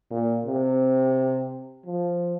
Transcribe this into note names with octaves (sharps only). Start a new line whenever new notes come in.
A#2
C3
F3